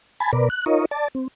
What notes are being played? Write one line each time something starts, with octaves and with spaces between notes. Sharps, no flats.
G#5 A5 B5
B2 A#4 B4 D5
F#6
D#4 F4 A#4 C#5 D#5
D5 A5
C4